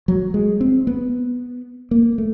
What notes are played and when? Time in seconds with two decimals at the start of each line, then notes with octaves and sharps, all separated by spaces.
0.08 F#3
0.34 G#3
0.61 C4
0.87 B3
1.91 A#3
2.18 A3